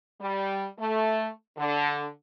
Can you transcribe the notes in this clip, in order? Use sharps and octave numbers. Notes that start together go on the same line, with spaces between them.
G3
A3
D3